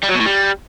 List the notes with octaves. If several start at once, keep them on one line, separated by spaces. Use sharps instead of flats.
G3
F#3
B2
A2
G3